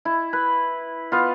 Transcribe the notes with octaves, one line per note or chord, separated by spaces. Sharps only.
E4
B4
B3 F4